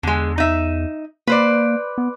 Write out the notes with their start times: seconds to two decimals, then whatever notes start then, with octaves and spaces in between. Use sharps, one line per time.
0.03 E2 D3 G#3
0.38 D#4 E5
1.27 A#3 B4 C5 D5
1.98 B3